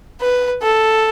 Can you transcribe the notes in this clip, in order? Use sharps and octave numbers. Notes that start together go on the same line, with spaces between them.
B4
A4